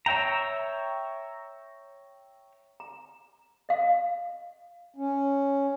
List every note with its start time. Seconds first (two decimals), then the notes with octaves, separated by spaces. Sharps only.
0.06 C#5 E5 G5 A#5
2.80 A#5
3.69 D#5 F5
4.96 C#4